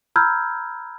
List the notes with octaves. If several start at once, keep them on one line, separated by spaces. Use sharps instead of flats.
A#5 B5 E6 F6 G6 G#6